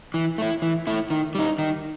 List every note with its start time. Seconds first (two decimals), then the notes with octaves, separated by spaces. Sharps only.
0.14 E3
0.38 A3 E4
0.62 E3
0.87 A3 E4
1.10 D#3
1.35 G3 D#4
1.59 D#3